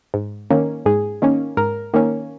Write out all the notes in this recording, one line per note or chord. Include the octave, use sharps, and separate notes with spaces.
G#2
D#3 A#3 C#4
G#2 G#4
D#3 A#3 C#4
G#2 A#4
D#3 A#3 C#4